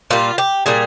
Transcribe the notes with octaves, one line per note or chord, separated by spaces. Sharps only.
A#2 G3 F4
G4
A#2 G3 G#4